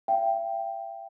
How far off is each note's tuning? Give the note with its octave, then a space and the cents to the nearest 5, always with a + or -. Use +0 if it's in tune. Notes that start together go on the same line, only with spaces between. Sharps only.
E5 +40 G5 +0